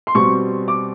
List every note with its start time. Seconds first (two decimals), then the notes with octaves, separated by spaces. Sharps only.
0.07 C6
0.14 B2 G3 C4 C#6
0.68 D6